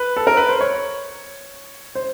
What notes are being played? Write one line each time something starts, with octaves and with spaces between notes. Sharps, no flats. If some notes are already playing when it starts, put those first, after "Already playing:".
Already playing: B4
A4
A#4
B4
C5
C#5
C5